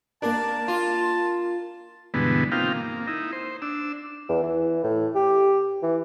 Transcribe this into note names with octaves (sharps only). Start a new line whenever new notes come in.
A#3 D4 A#4 A5
F4
G2 B2 D3 E3 G#3 B3
A#3 C4 D#4 F4 F5 G5
A#3
D#4 E4
C5
D4 E6
E2
E3
A2
G4
E3